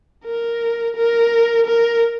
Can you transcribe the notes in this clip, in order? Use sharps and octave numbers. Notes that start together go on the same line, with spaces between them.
A#4
A#4
A#4